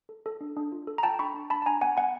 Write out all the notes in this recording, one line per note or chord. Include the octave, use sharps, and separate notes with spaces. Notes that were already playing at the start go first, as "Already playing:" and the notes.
A4
A4
D4
D4
F4
A4
A#5
F4 G5 A5
D4 B5 C#6
D4
D4 A5 B5
A5
D4 G#5 A#5
B3 F#5 G#5
B3 F#5 G#5